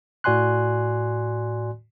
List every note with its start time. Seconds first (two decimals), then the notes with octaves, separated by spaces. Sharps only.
0.24 A2 F#4 D5 G#5 C6 F#6